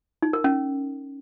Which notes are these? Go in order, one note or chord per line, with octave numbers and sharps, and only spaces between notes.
D#4
A#4
C#4